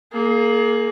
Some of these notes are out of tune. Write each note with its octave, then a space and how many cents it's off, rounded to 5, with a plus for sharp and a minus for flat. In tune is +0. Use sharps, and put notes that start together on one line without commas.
A#3 +0 G#4 +30